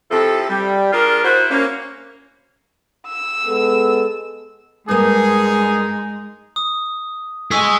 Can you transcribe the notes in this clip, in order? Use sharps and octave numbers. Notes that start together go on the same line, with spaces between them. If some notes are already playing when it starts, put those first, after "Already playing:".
C3 F3 E4 A4
G3
D4 F4 G#4 A#4
E4 F#4 C5
A#3 C#4
E6
G#3 B3 A4
G2 G#3 A#3 D#4 G#4
D#6
G#4 D#5 C#6 E6 B6